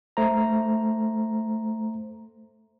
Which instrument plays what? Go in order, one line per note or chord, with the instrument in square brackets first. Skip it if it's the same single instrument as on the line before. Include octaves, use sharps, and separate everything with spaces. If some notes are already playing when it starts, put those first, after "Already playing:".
[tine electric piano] A3 C5 A#5